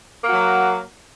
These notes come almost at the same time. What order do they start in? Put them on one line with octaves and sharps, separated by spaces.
A#3 F#4 F#3